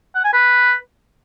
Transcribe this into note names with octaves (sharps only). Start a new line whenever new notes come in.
F#5
G#5
B4